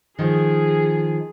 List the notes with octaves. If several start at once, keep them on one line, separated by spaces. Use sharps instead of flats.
D#3 F3 G#4